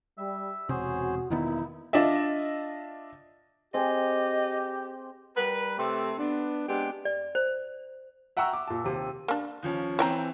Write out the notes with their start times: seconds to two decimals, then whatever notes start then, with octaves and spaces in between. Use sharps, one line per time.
0.18 G3 E5
0.69 E1 C3 C#4 F#4 G#4 C5
1.30 E1 A#2 D#3 B3 D#4 E4
1.93 D4 F4 D#5 E5
3.74 C4 G4 G#4 D#5
5.37 G3 A#4 B4
5.78 C3 A3 C4 G4 A4
6.18 B3 D4
6.68 G#3 B3 C4 D4 G4
7.05 D5
7.35 C5
8.37 E5 F#5 G5 A#5 C#6 E6
8.53 D6
8.67 A#2 A5
8.84 D#2 C3
9.28 A#3 D4
9.63 D#2 F3 C#4
9.99 E3 C4 C#5 G5 A#5